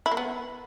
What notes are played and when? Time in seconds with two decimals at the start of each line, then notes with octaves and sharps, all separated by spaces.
0.06 E4
0.11 A#3
0.17 B3